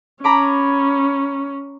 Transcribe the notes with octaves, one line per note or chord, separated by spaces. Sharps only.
C#4 A#5 B5 D6